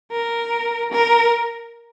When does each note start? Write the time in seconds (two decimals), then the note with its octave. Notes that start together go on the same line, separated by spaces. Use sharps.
0.12 A#4
0.92 A#4